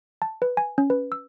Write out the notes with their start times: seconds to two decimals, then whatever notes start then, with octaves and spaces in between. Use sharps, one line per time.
0.22 A5
0.42 B4
0.57 G#5
0.78 C#4
0.90 B4
1.12 E6